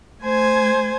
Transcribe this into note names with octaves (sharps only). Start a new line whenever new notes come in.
A3 C5 G#5 G#6